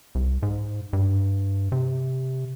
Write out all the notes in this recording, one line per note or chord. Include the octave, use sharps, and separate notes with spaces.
C2
G#2
G2
C3